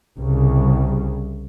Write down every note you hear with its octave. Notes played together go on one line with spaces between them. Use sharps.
C2 C#3